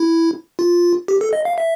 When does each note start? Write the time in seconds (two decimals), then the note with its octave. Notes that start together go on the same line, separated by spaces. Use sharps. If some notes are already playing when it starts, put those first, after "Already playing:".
Already playing: E4
0.59 F4
1.08 G4
1.21 A4
1.33 D#5
1.45 F5
1.58 E5